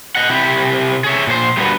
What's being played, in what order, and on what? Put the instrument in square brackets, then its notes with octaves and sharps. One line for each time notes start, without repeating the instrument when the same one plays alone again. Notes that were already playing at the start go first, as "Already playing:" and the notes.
[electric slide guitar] D#5 F#5
C3 E4 G4
G#4 C#5 E5
A#2 A4 C5
G3 A#3 B3 D4 F#4 B4